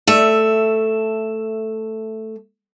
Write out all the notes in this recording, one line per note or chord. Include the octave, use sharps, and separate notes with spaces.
A3 E5